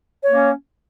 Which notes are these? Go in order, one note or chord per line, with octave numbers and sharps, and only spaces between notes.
A#3 C#4 C#5